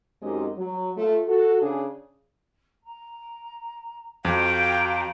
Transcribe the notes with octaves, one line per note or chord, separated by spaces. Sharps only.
F#2 D#3 G#3 C4 G4 D#5
F#3
A3 F4
F#4 A4
C#3 D4 G#4
A#5
F2 F#4 F5 G5 A#5